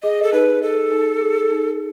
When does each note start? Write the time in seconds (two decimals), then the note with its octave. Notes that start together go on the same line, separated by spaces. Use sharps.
0.03 G#4 D#5
0.23 A4
0.33 D#4 B4
0.62 A4 D#5
0.92 D#4
1.21 G#4
1.51 D#4